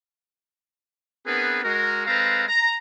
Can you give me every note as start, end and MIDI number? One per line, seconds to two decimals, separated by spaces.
1.26 1.63 59
1.26 1.63 60
1.26 1.63 62
1.26 1.63 68
1.26 1.63 70
1.26 1.63 71
1.64 2.06 56
1.64 2.06 66
1.64 2.06 70
2.07 2.45 56
2.07 2.45 60
2.07 2.45 69
2.07 2.45 71
2.07 2.45 77
2.07 2.45 82
2.48 2.77 82